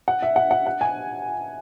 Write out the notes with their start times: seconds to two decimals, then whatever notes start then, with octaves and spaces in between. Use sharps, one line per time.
0.08 F#5
0.22 E5
0.36 F#5
0.51 F#5
0.67 F#5
0.81 G#5